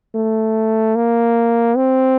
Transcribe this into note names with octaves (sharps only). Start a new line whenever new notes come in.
A3
A#3
C4